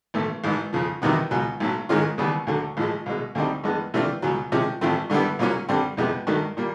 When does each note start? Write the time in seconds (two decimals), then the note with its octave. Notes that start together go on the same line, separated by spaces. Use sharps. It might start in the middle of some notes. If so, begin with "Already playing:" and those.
0.14 B1 A2 E3 A3
0.44 A1 G#2 E3
0.73 F2 C#3 F3
1.02 E2 C3 D#3 F#3 B3
1.31 C#2 B2 F#3
1.60 B1 A2 F#3
1.89 G#2 D#3 G#3 C#4 F4
2.18 D#2 C#3 E3 G3 B3
2.47 D2 D3 F#3
2.77 A1 A2 F3 G#3
3.06 C2 B2 G#3
3.35 D2 D3 G3 C4 D#4
3.64 G2 E3 G#3 B3
3.94 C3 E3 A3 D4 F4
4.22 C#2 B2 F#3
4.52 C3 F3 G#3 C#4
4.81 A1 A2 F3 A3 C4
5.10 G2 D3 G3 B3 E4
5.39 C2 A#2 F#3 A#3 C#4
5.69 G2 D3 G3 C4
5.97 F2 C3 F3 G#3 B3
6.27 G2 D#3 F#3 A3
6.57 A#2 G3 A#3